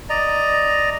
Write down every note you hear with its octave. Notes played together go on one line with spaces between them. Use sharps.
D5 D#5 A#5